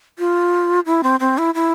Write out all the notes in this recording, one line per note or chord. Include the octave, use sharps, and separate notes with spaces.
F4
E4
C4
C4
E4
E4